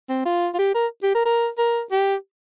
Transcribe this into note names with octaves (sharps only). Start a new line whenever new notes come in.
C4
F4
F4
G4
A#4
G4
A#4
A#4
A#4
G4